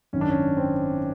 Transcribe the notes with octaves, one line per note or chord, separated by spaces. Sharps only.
G#1 F#2 D#3 C#4
D4
C#4
C4